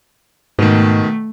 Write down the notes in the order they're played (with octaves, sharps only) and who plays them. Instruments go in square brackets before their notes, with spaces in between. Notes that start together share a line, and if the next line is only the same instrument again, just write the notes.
[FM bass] G#2 [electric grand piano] B2 D#3 [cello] A3